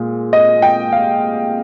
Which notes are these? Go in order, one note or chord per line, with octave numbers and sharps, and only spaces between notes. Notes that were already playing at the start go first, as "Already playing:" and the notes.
Already playing: A#2 G#3
D#5
G5
F5